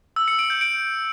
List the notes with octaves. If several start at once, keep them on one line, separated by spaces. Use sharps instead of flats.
E6
C#7
D7
G6
D7